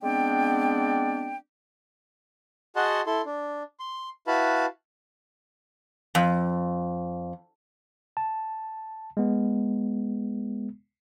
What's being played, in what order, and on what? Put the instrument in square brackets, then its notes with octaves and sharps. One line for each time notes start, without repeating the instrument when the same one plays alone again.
[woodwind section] G#3 B3 C4 D4 D5 G5
[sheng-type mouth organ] F#4 G#4 D#5 F#5 A5 C6
E4 A4 C6
D4
C6
E4 F#4 B4 F5 A5 B5
[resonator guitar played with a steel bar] F2
[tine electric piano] A5
G#3 B3